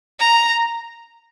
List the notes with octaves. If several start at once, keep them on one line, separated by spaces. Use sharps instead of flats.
A#5